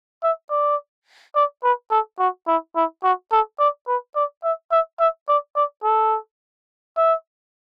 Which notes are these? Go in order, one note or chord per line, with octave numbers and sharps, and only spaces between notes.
E5
D5
D5
B4
A4
F#4
E4
E4
F#4
A4
D5
B4
D5
E5
E5
E5
D5
D5
A4
E5